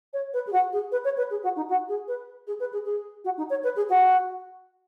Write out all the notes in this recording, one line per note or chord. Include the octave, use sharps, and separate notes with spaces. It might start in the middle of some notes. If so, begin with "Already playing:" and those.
C#5
B4
G#4
F#4
G#4
B4
C#5
B4
G#4
F#4
D#4
F#4
G#4
B4
G#4
B4
G#4
G#4
F#4
D#4
C#5
B4
G#4
F#4